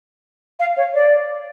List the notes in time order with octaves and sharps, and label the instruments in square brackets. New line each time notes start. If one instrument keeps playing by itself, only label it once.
[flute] F5
C#5
D5